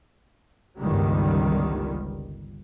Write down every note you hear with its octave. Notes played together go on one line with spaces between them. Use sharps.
G1 C#2 D#3 G3